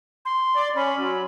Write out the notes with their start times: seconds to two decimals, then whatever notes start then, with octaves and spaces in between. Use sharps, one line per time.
0.25 C6
0.56 D5
0.76 C#4 B5
0.96 F#3